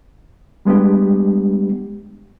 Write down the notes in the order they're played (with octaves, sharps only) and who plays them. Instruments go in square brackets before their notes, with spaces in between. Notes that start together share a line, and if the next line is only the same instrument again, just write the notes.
[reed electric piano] G3 G#3 B3 D4 G4